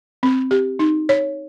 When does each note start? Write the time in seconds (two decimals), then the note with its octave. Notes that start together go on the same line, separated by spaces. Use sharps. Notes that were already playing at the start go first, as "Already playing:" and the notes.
0.23 C4
0.51 G4
0.79 D#4
1.09 C#5